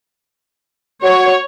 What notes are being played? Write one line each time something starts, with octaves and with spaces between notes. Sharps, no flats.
F#4 C#5